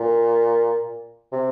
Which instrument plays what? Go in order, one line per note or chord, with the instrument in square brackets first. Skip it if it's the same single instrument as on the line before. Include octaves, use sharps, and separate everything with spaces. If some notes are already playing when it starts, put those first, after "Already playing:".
Already playing: [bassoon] A#2
C3